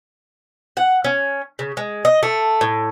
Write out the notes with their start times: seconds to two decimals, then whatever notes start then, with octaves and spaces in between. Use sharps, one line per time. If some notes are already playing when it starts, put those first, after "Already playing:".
0.77 F#5
1.04 C#4
1.59 C#3
1.77 G#3
2.05 D#5
2.23 A3
2.61 A2